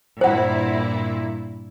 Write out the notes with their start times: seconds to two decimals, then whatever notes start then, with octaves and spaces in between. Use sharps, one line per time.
0.21 G2 A#2 E4 C5 F#5